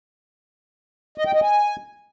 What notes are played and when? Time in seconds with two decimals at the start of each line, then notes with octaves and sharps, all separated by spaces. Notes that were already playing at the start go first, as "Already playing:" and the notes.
1.18 D#5
1.26 G5
1.34 D#5
1.42 G#5